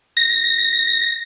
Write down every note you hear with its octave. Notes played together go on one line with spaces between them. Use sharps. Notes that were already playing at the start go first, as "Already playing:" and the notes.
A#6